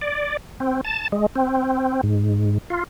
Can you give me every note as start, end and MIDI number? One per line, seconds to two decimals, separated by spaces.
0.01 0.37 74
0.60 0.81 60
0.85 1.08 81
1.12 1.26 56
1.35 2.01 60
2.03 2.58 44
2.70 2.84 65